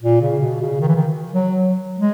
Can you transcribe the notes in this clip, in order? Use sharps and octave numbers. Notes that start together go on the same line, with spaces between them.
A#2
C#3
B2
C#3
D#3
E3
D#3
F#3
G#3